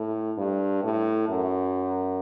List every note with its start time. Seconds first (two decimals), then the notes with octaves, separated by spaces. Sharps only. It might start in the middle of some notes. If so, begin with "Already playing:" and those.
Already playing: A2
0.37 G2
0.84 A2
1.29 F#2